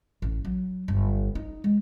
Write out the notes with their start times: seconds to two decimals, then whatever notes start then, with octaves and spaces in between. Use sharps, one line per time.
0.22 A1
0.45 F#3
0.88 G1
1.35 D#4
1.64 G#3